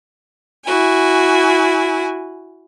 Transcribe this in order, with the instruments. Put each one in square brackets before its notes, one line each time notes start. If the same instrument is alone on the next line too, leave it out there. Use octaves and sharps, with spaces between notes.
[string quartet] E4 F#4 G#5